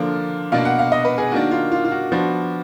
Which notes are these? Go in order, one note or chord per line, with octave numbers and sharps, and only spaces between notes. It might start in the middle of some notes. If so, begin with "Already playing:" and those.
Already playing: D3 F3 A#3 D4
B2 A#3 D4 F5
F#5
F5
D#5
B4
G#4
D#3 A#3 D4 F#4
F4
F4
F4
F#4
F3 B3 D4 F#4